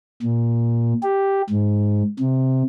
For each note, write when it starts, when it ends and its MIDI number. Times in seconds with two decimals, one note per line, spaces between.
0.23 0.94 46
1.03 1.42 67
1.50 2.03 44
2.20 2.63 48